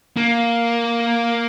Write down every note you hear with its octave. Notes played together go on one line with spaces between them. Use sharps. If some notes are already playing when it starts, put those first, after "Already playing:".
A#3